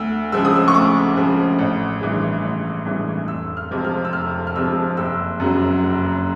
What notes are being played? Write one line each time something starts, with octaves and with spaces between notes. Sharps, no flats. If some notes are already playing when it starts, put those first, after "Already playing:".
Already playing: D2 E6
C#3 F3 G#3 E6
D#6
E6
C#6
D2 D6
C#3 F3 G#3
A1
G2 E3 G#3
A1
G2 E3 G#3
F1 E6
F6
F2 C3 F3 G#3
F6
E6
F1 F6
F6
F2 C3 F3 G#3 E6
F#1 E6
F#2 C#3 F#3
F#1